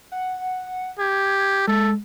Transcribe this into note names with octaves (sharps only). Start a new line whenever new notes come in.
F#5
G4 G#6
G#3 A4